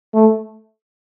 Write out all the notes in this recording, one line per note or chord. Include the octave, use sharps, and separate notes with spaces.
A3